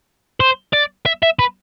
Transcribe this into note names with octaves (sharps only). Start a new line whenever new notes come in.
C5
D5
E5
E5
B4